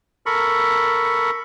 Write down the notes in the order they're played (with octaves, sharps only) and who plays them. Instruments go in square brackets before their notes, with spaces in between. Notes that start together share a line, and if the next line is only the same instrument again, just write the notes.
[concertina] A4 A#4 B5 C#6